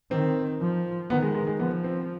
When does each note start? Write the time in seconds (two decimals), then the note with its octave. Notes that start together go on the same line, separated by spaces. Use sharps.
0.10 D#3 C4
0.61 F3
1.09 D#3 B3
1.23 G#3
1.35 G#3
1.47 G#3
1.59 F3 B3
1.84 C4